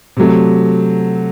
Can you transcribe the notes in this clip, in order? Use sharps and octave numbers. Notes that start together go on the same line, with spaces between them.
C3 F#3 A3